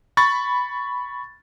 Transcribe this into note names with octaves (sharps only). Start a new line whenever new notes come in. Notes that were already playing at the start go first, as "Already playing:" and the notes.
B5 C#6 A6